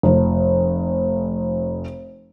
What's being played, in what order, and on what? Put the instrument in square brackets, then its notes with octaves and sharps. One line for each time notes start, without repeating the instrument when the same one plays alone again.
[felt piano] F1 F3